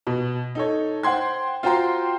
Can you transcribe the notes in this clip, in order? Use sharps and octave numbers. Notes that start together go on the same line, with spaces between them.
B2
D#4 A4 C#5
C5 F#5 G5 C6 G#6
F4 F#4 C5 G5 A#5 C6